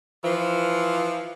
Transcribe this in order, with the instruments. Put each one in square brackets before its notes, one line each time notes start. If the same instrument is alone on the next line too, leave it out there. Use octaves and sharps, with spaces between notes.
[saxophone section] E3 F3